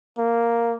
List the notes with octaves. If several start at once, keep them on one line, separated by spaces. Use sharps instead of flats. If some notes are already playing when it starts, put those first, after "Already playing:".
A#3